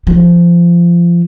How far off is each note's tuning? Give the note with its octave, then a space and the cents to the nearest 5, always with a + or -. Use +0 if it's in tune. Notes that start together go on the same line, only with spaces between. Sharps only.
F3 -20